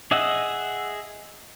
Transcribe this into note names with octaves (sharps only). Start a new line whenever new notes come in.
G#4 D#5 E5 F#5